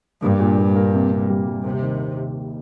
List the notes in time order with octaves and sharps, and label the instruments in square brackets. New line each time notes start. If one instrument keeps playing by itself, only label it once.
[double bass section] G2 [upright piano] A#3
[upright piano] A#2
A#2
A#3
C3
C3
G3
G3
[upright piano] D#2 [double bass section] C3
[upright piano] D#3